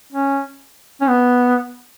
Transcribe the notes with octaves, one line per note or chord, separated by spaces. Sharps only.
C#4
C#4
B3